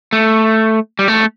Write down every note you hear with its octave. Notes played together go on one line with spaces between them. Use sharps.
A3
G3
A3